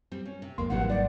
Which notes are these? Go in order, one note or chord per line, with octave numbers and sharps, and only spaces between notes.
G3 C4
C#4
C3
B1 F2 G#2 A#3 C6
G#1 C3 D#3 E3 F#3 G3 A#3 F#5
D#4 D5